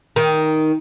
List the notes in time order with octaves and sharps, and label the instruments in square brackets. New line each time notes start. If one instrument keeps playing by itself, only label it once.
[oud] D#3